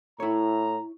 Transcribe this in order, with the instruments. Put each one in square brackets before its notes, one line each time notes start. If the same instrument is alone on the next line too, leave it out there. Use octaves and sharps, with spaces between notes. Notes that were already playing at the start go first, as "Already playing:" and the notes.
[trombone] A2 [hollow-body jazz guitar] E4 C#5 [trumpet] A#5